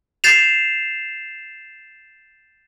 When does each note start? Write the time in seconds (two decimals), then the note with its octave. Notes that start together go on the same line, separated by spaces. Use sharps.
0.24 G6 A6 C7 E7 F7